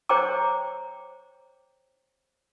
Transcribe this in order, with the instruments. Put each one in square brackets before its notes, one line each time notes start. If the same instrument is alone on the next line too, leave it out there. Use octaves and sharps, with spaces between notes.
[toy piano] C5 C#5 G5 A#5 D6